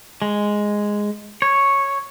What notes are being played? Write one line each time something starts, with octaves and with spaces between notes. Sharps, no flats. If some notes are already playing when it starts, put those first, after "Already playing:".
G#3
C#5